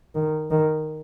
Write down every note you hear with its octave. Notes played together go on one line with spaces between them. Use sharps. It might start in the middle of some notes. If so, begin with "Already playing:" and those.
D#3
D#3